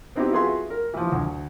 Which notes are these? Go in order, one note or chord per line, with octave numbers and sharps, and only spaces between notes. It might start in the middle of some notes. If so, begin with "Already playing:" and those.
B3 C4 D#4 E4 F#4 G4
F4 F#4 G#4 B4 E5 C6
A#4
E3 F3
D2